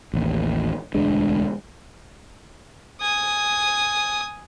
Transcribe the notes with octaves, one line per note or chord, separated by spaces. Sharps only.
A1 D#2
E1 D2 G#3 D4
G#5 D#6